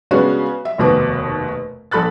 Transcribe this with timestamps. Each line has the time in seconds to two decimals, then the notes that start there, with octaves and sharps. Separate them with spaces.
0.11 C#3 G#3 B3 C#4 D4 F#4
0.65 E5
0.78 F1 D#2 B2 F#4 B4 D6
1.91 A#1 A4 B5 F#6 A6